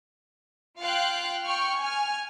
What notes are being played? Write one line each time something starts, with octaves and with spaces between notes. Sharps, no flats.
F4 F5 G5 C6 F#6 D7
G5 C#6 F6
G#5 F6